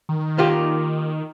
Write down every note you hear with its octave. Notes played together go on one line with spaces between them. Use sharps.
D#3
A#3 F4 G4